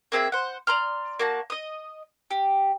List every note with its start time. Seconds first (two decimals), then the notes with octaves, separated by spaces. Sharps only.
0.12 A#3 C4 G#4 E5
0.32 C5 F#5
0.67 D5 A#5 C6 F6
1.19 A#3 F#4 A5
1.50 D#5 D#6
2.31 G4